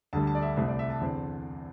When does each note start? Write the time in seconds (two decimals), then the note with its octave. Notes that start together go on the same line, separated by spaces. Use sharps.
0.13 D2 D3 G3 A5
0.27 A5
0.35 D5
0.42 E5
0.56 C2 C3 A3 C4 E5
0.68 D5
0.79 E5
0.90 A5
1.01 E2 D3 C4